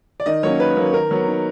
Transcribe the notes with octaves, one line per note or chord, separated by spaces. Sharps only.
D5
D#3 D#5
F#3 A#3 C#4 C#5
D#3 B4
F#3 A#3 C#4
D#3 A#4
F#3 B3
D#3